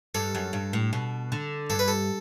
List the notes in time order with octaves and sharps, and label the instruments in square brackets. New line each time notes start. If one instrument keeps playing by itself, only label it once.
[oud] G2 [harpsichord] A4
[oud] F#2
G2
A2
B2
D3
[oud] G2 [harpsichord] A4
[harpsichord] B4
A4